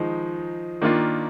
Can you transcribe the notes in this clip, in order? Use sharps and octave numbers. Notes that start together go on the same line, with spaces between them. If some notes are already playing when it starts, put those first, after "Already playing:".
Already playing: D#3 F3 G#3 D#4
D#3 A#3 D4 F4